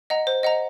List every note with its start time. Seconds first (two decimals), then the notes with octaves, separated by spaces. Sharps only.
0.10 D#5 F#5 A#5
0.27 C5
0.43 D#5 F#5 A#5